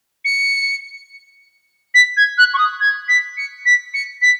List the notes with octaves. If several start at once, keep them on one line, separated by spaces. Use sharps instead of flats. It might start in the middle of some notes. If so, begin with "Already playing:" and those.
C#7
B6
G#6
F#6
C#6
D#6
G#6
B6
C#7
B6
C#7
B6